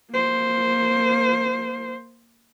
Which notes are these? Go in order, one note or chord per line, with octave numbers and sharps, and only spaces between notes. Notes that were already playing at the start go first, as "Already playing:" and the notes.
A#3 C5